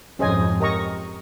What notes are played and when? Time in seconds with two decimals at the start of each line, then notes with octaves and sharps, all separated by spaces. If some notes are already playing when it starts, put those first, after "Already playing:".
0.18 F2 G#2 C#4 G#4 C5 D#5 G#5
0.60 G4 A#4 D#5 A#5 C#6